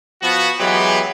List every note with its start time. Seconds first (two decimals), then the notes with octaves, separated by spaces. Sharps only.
0.22 F3 B3 F#4
0.60 E3 F#3 G#3 B3 G4 B4